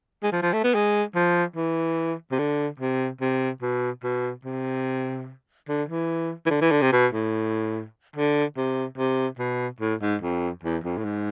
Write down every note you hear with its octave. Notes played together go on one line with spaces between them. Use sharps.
G#3
F3
F3
A3
B3
G#3
F3
E3
C3
D3
C3
C3
B2
B2
C3
D3
E3
E3
D3
E3
D3
C3
B2
A2
D3
C3
C3
B2
A2
G#2
F2
E2
F2
A2
G#2